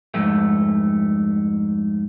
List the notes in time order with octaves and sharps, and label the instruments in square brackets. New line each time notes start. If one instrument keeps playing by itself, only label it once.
[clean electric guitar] F2 G#2 A3